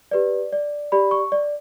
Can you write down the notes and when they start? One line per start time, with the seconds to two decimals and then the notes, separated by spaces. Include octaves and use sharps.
0.11 G4 B4 D5
0.52 D5
0.92 G4 D5 B5
1.11 C#6
1.32 D5